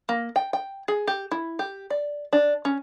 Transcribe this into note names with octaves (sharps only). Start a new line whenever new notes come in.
A#3
G5
G5
G#4
G4
E4
G4
D5
D4
C#4